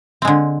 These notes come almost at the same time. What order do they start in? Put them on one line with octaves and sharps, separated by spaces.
C4 G#3 D3